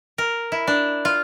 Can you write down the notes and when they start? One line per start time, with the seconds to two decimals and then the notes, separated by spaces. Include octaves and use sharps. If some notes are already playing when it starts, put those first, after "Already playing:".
0.18 A#4
0.52 E4
0.67 D4
1.05 F4